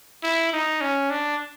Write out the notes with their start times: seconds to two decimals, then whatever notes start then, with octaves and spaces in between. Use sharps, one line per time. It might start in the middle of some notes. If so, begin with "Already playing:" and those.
0.23 E4
0.53 D#4
0.81 C#4
1.10 D4